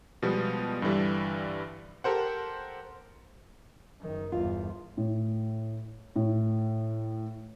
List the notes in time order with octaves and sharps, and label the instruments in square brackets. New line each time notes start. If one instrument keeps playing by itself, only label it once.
[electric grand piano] B2 F3 G3 G#3 B3
G2 D3 E3 G3
G4 A4 A#4 C5 F#5
[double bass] F#1 D#3
[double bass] G1 E2 [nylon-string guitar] F4
[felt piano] A2
A2